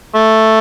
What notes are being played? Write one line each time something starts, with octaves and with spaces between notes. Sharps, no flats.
A3